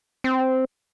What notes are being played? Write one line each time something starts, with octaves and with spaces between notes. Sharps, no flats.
C4